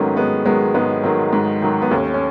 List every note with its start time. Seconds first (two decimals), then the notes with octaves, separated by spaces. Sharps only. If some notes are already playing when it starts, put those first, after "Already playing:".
Already playing: G#2 D#3 F#3 A3 B3 C#4
0.16 G#2 G#3 B3
0.45 D#3 F#3 G#3 B3
0.74 G#2 G#3 B3
1.03 D#3 F#3
1.33 G#2
1.62 D#3 F#3
1.82 B3
1.91 D#2 A3 C#4
2.14 C#4